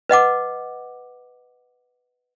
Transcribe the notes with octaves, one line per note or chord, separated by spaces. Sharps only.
B4 D#5 F#5 D6